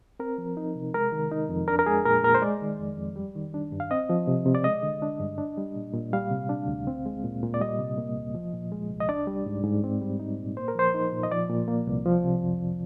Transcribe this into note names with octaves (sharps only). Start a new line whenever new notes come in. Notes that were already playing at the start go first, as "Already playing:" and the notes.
C4 A#4
F3
D#4
C3
G#3 A#4
D#3
D#4
F2
D4 A#4
A#4
G#3 G#4
A#2 A#4
A#2 A#4
C5
G#3 D5
D#3
F2
F2
G3
D#3
D4
G2
F5
C4 D#5
F3
C3
C3
D5
G#3 D#5
D3
D4
G2
D4
G3
A#2
A#2
G3 F5
C3
D4
D2
C4
G#3
A#2
A#2
D5
G3 D#5
C3
A#3
D2
F3
A#2
G#3
C2
D#5
D4 D5
G3
G#2
G#2
C4
G3
D#4
A#2
A#3 C5
A#4
F3 C5
D#4
A#2
D#5
F3 D5
A#2
A#3
C2
F3
C3
F2